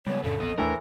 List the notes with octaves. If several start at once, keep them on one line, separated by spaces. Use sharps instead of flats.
C#2 G3 B3 C#5
F2 A2 C#3 D4 A4
D#1 A1 F2 B3 D#5
D#2 A2 E3 A3 D4 A#4 B4